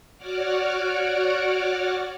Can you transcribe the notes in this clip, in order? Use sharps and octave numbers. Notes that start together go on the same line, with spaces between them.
F#4 C#5 D5 F#5 D6 F6